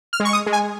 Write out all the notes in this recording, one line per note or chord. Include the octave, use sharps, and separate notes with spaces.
F6
G#3
C#6
D#6
G#3
G#5